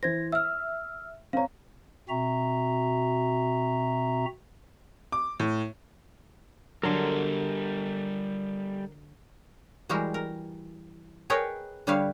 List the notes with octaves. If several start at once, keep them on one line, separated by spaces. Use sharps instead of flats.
E3 C5 G#6 A#6
E5 E6 F6
C4 C#5 F5 A#5
B2 C4 F#4 E5 A#5
D6
A2
D3 F#3 G3 A4 A#4 C6
E3 G3 G#3 F#4 G4 A#4
A#4
G#4 A#4 B4 C#5 D#5 G5
D3 G3 G4 B4 C#5 F5